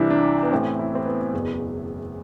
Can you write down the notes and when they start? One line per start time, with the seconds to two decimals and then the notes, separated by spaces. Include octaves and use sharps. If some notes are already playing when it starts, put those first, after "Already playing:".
Already playing: C2 C3 E3 D4 E4
0.10 D4
0.43 B3
0.51 A1 A2 E3 C4
0.79 E4
0.95 C4
1.06 B3
1.33 F#1 E2 B2